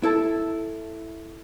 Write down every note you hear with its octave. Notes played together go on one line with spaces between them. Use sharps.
E4 A4 A5